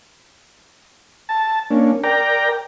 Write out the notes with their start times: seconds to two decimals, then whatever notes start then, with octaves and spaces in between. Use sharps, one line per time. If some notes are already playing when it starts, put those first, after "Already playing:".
1.29 A5
1.71 A#3 C#4 D4
2.04 A#4 D5 G5 A#5